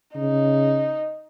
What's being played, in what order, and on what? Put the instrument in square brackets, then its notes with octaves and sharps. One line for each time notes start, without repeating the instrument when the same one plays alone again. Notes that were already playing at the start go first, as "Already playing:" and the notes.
[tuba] C#3 [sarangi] D#4